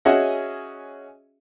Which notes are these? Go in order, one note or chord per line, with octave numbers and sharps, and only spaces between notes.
C#4 F#4 G#4 D#5 E5 F#5